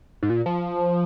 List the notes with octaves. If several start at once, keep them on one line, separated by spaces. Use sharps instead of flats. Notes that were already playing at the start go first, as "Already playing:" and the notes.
G#2
A#2
F3